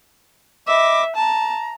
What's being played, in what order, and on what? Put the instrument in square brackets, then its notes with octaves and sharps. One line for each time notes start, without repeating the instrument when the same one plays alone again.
[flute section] D#5 B5 D6 [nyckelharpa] E5
[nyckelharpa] A5 [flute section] A#5